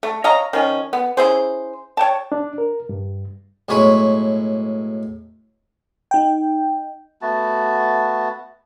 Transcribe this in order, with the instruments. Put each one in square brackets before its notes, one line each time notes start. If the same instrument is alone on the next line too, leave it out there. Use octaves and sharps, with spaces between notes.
[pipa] A3
C#5 D#5 F5 A#5
D#3 F3 C#4
B3
C#4 E4 G#4 C5
C#5 G5 A5
[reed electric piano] D4
A#4
G2
[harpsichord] B1 A2 G#3 C#5 B5 C#6
[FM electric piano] D#4 G5
[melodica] A3 B3 F#4 A5